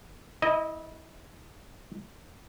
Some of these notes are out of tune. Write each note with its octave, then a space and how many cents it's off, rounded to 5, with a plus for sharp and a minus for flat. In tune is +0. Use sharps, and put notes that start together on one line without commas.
E4 -25 D#5 +5